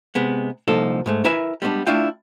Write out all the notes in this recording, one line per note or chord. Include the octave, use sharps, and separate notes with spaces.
C3 G#3 B3
C2 A#2 F3 D#4 A4
G#2 G#3 A3
E4 A#4 B4 E5 G#5
G3 G#3 B3 C#4 D4
A3 D4 E4 F4 G5